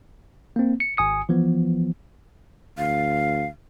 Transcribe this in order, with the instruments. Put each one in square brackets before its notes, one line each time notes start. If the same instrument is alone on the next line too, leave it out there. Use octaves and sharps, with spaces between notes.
[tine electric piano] A#3 C4
C#7
G#1 G#5 D#6 C#7
E3 F3 B3
[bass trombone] D2 [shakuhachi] F5